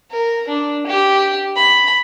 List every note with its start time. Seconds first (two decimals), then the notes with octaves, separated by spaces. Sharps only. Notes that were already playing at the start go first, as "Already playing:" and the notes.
0.11 A#4
0.48 D4
0.87 G4
1.56 B5